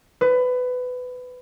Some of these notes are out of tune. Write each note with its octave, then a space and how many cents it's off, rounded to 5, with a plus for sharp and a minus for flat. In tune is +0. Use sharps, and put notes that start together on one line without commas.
B4 +20